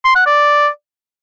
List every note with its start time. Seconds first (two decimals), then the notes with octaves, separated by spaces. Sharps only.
0.04 C6
0.15 F#5
0.26 D5